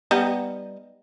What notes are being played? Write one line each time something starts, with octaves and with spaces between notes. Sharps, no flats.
G3 B3 D#4